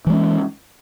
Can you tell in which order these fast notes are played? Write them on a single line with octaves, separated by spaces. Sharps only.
E3 G#3 C#4